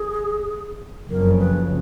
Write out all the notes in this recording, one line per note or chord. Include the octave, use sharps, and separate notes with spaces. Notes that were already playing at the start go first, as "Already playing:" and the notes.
Already playing: G#4
F#1 F2 C#3 A#4
B4